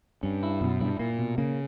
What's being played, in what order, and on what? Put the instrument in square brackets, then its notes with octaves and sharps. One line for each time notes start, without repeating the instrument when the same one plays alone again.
[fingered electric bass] G2 [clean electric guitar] C#4
[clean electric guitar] E4
[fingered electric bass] F#2 [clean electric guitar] B2
[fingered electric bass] G2 [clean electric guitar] E4
[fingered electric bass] A#2 [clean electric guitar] A#3
[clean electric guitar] B2
[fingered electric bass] C#3 [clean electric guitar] A#3